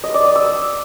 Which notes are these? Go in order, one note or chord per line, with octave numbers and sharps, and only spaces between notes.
D#5
D5
D#6
E6